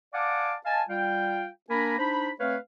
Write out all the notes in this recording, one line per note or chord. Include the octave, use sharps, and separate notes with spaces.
D5 F5 F#5 G#5 A5 D6
D#5 F5 G#5 A5
G3 F4 F5 G5
A#3 D4 A#4 G#5 A#5 B5
D4 D#4 C5 B5
A3 C4 B4 C#5 F5